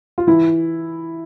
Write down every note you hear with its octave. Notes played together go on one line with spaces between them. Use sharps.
F4
E3 E4